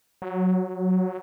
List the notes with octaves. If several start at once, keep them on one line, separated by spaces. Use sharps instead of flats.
F#3